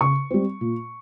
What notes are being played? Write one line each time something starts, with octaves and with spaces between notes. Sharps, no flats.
C#3 C#6
G3 C4
A#2